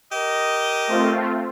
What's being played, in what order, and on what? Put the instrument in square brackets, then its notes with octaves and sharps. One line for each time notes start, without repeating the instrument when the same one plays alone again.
[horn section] G4 A#4 D#5
[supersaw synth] A3 C4 F4